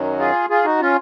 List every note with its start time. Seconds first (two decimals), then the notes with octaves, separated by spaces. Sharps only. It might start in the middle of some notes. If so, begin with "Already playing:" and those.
Already playing: F#2 D#3 F#3
0.19 F4 G#4
0.50 F4 G#4
0.65 D#4 F#4
0.81 C#4 F4